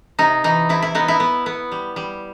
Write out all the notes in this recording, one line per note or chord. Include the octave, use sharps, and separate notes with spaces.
C3 D#4
E3 D#4
C3 E4
E4
B3 D#4
E4
B3
B3
G3
G3